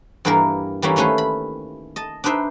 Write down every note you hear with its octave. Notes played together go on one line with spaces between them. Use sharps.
G2 E3 G3 A#3 E4 A#4
E3 G3 A#3 C#4 E4
D#3 A3 C#4 E4 B4 C5
B5
D#5 A5
D4 D#4 B4 C5 E5